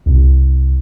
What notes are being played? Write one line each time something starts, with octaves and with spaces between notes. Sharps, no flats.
C2